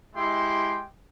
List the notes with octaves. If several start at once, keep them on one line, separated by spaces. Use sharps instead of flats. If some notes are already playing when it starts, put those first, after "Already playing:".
G#3 E4 G4 G5 C6